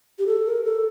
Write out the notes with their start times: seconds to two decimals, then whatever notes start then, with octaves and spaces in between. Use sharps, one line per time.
0.19 G4
0.27 A4
0.46 A#4
0.65 A4